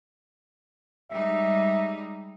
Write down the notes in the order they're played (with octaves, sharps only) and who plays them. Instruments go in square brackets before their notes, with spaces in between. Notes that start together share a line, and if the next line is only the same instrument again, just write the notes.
[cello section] G3 G#3 D#4 [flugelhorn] E5